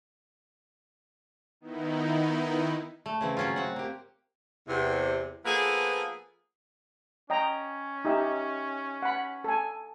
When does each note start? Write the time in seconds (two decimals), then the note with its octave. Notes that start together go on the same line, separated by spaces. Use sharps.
1.61 D#3 B3 D#4 E4
3.06 A3
3.21 C#3 E3 C4
3.37 F#3 C#4 F4
3.56 C4 F#5
3.76 A#3 G4
4.68 E2 C3
5.45 F3 A#3 B3 G#4 A4 B4
7.30 C#4 D#5 G5 A#5
8.05 D#4 G4 E5
9.03 F#5 B5
9.44 A4 G#5